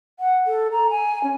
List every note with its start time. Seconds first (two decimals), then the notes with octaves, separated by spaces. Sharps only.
0.20 F#5
0.47 A4
0.72 A#5
0.90 G#5
1.24 C#4